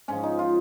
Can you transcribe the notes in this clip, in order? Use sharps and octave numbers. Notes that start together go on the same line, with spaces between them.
G#2 F3 C#4
D#4
F4